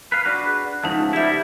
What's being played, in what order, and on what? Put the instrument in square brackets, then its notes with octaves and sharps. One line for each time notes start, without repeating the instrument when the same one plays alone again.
[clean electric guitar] B4 F5
D4 F#4 B4
[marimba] G#4
[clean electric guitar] C#2 F3 A3 [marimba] D#4 F#5
[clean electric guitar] G3 E4 [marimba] G4 E5